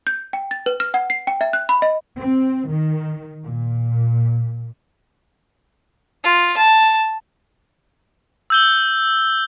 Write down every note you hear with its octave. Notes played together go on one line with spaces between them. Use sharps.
G6
G5
A6
B4
F6
F#5
C7
G5
E5
F#6
B5
D#5
C4
D#3
A#2
F4
A5
E6 G6 G7